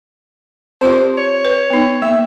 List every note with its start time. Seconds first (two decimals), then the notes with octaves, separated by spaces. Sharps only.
0.81 C4 F4 G4 C5
1.17 C#5
1.45 B4
1.70 B3 D#4
2.02 A#3 E5